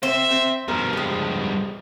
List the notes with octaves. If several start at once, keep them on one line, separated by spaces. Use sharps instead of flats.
C4 C5 E5
C4
G2 B2 F3 A#4
G3 G#3